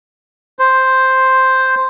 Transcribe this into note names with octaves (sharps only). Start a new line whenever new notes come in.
C5